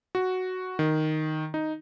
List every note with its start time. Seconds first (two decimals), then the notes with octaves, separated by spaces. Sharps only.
0.15 F#4
0.79 D#3
1.54 D#4